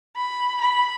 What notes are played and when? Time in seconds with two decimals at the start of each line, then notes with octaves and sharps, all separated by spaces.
0.16 B5
0.61 B5